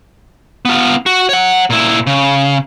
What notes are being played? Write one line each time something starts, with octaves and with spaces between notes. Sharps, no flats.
B3 F4
F#4
C#5 F#5
A#2 E4
C#3